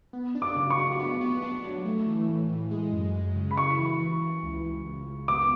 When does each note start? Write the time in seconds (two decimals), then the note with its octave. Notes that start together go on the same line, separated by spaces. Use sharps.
0.13 B3
0.35 D4
0.42 D6
0.56 C#3
0.70 C#6
0.78 D4
0.99 B3
1.21 B3
1.42 D4
1.63 F#3
1.85 A3
2.06 E3
2.28 A2
2.49 E3
2.71 G#3
2.93 F#2
3.14 G#3
3.35 C#3
3.51 B5
3.57 E4 C#6
3.79 E3
3.99 E3
4.21 E3
4.43 C#2
4.64 C#2
4.86 C#2
5.07 C#2
5.28 B3 D6